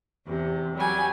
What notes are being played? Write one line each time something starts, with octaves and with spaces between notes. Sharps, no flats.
E2 C3
F#3 G3 G#5